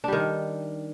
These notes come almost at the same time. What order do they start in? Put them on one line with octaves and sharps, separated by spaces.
D4 G3 D#3